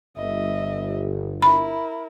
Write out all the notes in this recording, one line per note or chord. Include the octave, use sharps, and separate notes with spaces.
G1 D#5 E5
E4 A#4 B5